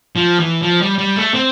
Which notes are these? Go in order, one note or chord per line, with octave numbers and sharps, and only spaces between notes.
F3
E3
F3
G3
G3
A3
C4